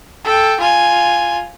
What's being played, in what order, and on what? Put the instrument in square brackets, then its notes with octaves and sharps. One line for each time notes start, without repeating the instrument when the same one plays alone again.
[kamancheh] A4 G5
F4 G#5